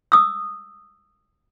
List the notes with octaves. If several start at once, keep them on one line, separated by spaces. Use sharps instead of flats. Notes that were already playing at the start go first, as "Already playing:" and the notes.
D#6 E6